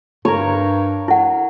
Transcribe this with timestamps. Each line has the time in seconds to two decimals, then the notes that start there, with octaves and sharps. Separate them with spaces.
0.25 G2 A#4 C#5
1.08 E4 F#5